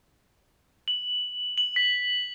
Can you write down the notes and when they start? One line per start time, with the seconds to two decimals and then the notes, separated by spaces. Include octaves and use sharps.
0.88 F#7
1.58 F#7
1.76 B6